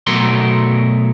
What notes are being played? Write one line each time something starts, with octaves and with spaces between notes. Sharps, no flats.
B2 F#3 A3 A#4 C6